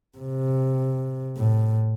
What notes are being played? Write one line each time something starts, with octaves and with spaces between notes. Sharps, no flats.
C3
A2